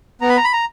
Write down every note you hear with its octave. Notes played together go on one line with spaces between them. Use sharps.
B3 A#5
B5
A#5
B5
A#5